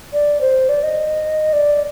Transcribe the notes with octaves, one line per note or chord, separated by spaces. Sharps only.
D5
C5
D5
D#5
D5